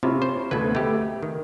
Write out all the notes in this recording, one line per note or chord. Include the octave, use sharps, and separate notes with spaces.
C3 C#4 E4 F4
C5
D2 B2 A4 B4 G#6
A3 G4 E5
D#3